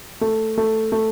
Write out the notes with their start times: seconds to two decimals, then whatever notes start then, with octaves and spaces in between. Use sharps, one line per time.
0.21 A3
0.58 A3
0.92 A3